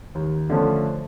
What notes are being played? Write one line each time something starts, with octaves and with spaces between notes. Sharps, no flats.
D#2
D3 F3 A3 C#4